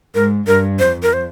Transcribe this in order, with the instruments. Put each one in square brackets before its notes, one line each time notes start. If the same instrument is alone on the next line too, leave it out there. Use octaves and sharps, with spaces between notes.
[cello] G#2 [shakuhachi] A#4
[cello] G2 [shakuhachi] A#4
[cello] F2 [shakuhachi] C5
[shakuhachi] A#4
C5